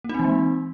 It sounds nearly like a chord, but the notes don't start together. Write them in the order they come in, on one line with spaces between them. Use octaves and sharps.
A#3 D#4 C4 E3 G#3